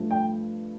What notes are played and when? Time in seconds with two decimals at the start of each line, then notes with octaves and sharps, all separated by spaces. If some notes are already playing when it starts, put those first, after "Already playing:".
Already playing: G2 F3 A3
0.11 G5